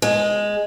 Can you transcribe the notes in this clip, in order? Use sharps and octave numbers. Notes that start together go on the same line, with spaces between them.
G#3